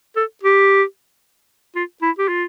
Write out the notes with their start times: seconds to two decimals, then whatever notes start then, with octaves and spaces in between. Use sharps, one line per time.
0.16 A4
0.43 G4
1.76 F4
2.02 E4
2.19 G4
2.28 F4